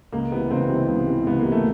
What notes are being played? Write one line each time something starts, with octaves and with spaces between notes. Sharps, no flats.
C#2 A#3
C3 E3 B3
C#2 C4
C3 E3
C#2
C3 E3
C#2 B3
A#3
C3 E3
A3